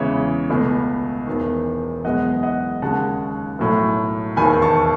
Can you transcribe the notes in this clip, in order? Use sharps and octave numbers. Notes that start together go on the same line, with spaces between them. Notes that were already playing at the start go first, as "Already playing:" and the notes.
Already playing: E2 C#3 E3 G#3 C#5 E5
C#2 B2 A3
E1 E2 D#3
F#1 E2 B2 G#3 D#5 F#5
D#5 F#5
D#2 C#3 G#3 F#5 A5
B1 A2 F#3 A3
E1 D#2 D#3 G#5 B5
A5 C#6